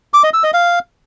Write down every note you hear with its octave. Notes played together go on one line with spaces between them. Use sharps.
D6
D#5
E6
D#5
F5